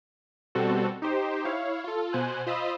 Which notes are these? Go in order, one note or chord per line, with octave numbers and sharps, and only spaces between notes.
B2 G3 C4 F#4 A4
D#4 G4 C5
E4 C#5 F5
F4 A4
B2 C5 G#5 F#6
F4 C5 D#5 B5 D#6 E6